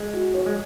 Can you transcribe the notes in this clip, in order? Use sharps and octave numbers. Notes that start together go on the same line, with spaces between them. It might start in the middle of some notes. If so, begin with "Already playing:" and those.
Already playing: G#3
F#4
C#5
G#3